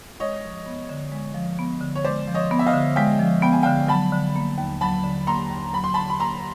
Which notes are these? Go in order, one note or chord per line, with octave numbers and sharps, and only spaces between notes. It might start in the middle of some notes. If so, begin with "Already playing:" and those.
G#3 C#5 D#5
F3
B3
D3
G#3
F3
B3
D3
C#5
G#3 C5 D5
F3
C#5 D#5
B3
E5
D#5 F5
D3
G#3 F5 G5
F3
B3 G5
G#5
D3 F5 G5
F#3 A5 B5
D3
A#3
D#2
F#3 A5 B5
D3
A#3 A#5 C6
D#2
F#3 B5
C6
D3 A5 B5
B5
A#3 A#5 C6